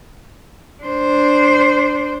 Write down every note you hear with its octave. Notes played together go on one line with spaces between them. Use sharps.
D4 C5